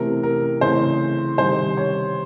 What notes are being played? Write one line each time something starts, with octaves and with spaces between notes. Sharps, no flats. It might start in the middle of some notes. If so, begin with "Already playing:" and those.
Already playing: C3 E3 A3 C4 A#4
A#4
C#3 E3 A3 C4 C5
C3 D#3 G3 C5
C#5